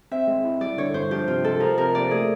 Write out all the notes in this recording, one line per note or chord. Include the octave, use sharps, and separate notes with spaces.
C4 E5
G#3
E4
G3 D5
D3 C#5
G2 C5
F3 G4
C3 F4
G#3 A4
F3 A#4
C3 A#4
A#3 D5
A3 G#4